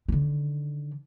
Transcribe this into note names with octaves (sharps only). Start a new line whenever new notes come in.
D3 D#3